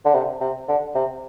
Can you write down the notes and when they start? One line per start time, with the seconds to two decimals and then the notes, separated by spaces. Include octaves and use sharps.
0.05 D3
0.14 C3
0.41 C3
0.68 D3
0.95 C3